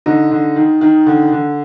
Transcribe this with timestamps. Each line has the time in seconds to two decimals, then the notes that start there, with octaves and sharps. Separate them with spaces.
0.06 D3 D#4
0.31 D3
0.56 D#3
0.81 D#3
1.06 D3
1.32 D3